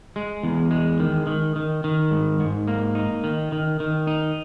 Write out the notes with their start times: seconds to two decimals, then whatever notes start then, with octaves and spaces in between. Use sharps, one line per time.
0.16 G#3
0.43 E2
0.71 G#3
1.00 D#3
1.27 D#3
1.56 D#3
1.84 D#3
2.11 G#2
2.40 G#2
2.68 A#3
2.95 D#4
3.24 D#3
3.52 D#3
3.80 D#3
4.07 D#4